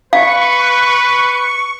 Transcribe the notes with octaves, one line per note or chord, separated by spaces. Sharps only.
B4 F5 C#6